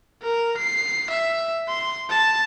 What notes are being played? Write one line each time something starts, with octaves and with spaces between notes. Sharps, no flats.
A#4
C7
E5
C6
A5